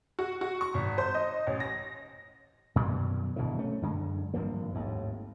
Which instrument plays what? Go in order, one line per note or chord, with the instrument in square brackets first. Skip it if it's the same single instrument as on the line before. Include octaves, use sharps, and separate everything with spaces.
[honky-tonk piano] F#4
F#4
C#6
G#1
C5
D#5
A1
A#6
[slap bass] F#2 B2 D#3 G3
G#1 B2 D3 E3
A3 C#4
F#2 D3 G#3
G#1 G2 F3 A#3
G#1 D#2 A2